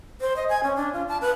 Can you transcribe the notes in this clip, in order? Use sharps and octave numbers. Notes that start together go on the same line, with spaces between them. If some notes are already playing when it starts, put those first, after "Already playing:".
C5
D#5
G#5
C#4
D4
F4
A5
B4